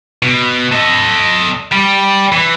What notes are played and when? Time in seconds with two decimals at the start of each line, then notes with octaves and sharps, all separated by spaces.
0.23 B2
0.72 A4 D#5
1.72 G3
2.32 E3